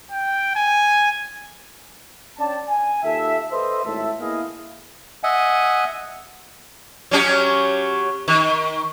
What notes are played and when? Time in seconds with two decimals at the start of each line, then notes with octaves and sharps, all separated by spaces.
0.11 G5
0.56 G#5
2.39 C#4 D4 D5 G5 A5
2.68 G#5
3.03 D#2 F4 A4 E5
3.51 A4 B4 C5 D#5 E5
3.84 G#1 D#2 A2 A4 E5
4.19 A#3 B3 E4 G#4 D#5 F5
5.23 D#5 E5 F#5 G#5
7.11 F#3 C#4 G4
8.28 D#3